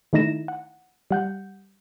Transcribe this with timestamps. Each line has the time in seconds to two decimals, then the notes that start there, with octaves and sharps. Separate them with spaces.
0.13 D#3 A3 D#4 E4 A#6 E7
0.48 F#5
1.11 G3 F#5 G6